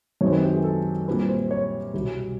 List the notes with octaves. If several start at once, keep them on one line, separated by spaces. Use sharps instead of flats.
F#2 D#3 G#3 C4 C#5
B4
G4
G#4
A4
A#2 G3 C4 B4
C5
C#5
C2 B2 G3